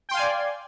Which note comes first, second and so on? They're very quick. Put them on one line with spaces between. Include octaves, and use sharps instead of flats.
G5 C6 F5 G#5 D5